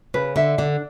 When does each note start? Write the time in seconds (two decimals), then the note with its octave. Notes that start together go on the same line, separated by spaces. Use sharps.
0.14 C#3 B4
0.36 D3 E5
0.58 D3 D4